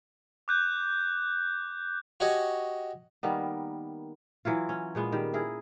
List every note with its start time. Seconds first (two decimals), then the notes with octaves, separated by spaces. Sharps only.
0.48 D6 F#6 G6
2.20 F#4 G4 C#5 D#5 G#5
3.23 D#3 G3 A#3 B3
4.45 E3 F#3 E4 F4
4.69 C#4
4.95 A#2 G#3 B3
5.12 D#3 G3
5.34 E4 G#4 A#4